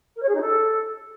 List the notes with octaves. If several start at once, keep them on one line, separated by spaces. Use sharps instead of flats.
A#4
C#5
G#4
D#4
A4